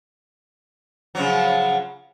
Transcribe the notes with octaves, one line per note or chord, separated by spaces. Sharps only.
C#3 F3 F#3